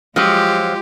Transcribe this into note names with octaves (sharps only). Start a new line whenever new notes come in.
F3 F#3 G#3 F4 G4